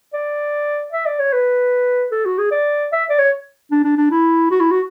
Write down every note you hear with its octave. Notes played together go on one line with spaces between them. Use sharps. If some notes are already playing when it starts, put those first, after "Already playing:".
D5
E5
D5
C#5
B4
A4
F#4
G#4
D5
E5
D5
C#5
D4
D4
D4
E4
F#4
E4
F#4